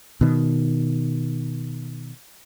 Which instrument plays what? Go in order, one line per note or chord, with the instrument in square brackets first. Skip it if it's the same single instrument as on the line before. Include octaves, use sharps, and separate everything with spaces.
[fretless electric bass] B2 D#3